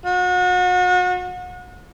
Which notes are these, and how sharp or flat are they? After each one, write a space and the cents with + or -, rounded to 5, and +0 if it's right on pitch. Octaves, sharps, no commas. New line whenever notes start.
F#4 -35